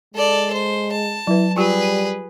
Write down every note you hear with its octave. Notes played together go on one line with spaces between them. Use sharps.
G#3 A4 D5
C5
A5
F#3 E4 B4
G3 F4 G4 G#4 B4